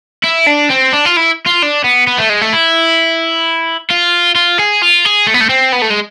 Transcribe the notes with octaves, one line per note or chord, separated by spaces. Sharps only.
E4
D4
C4
D4
F4
E4
F4
D4
B3
B3
A3
G#3
A3
E4
F4
F4
G#4
F4
G#4
A3
B3
A3
C4
B3
A3
G#3